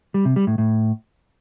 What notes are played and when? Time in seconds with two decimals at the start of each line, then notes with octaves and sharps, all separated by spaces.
0.14 G3
0.25 C3
0.36 G3
0.47 A2
0.58 A2